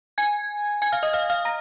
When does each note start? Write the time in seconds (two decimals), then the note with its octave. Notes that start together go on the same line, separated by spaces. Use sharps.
0.18 G#5 G#6
0.82 G#5 G#6
0.92 F5 F6
1.03 D#5 D#6
1.13 F5 F6
1.30 F5 F6
1.45 A#5 A#6